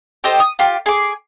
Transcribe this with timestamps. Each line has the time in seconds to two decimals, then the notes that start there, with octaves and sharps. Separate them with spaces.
0.24 G4 A4 C5 D#5
0.40 D#6
0.59 F4 G4
0.86 G#4 D6